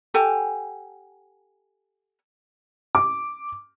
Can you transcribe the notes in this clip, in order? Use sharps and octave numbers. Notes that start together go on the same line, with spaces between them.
G4 A4 F#5 G#5
D6